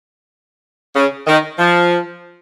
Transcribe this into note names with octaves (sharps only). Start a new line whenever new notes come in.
C#3
D#3
F3